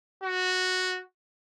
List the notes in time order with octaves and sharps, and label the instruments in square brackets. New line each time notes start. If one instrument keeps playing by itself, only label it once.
[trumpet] F#4